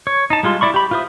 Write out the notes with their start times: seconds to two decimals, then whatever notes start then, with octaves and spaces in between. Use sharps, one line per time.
0.07 C#5
0.30 D#4 A5
0.43 G3 G#3 F4 C6
0.61 E4 D5 B5 C#6
0.74 G4 B5
0.91 F4 B4 C5 E5 D#6